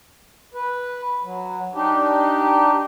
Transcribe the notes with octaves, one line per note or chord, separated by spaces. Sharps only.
B4
F#3
D4 D#4 G4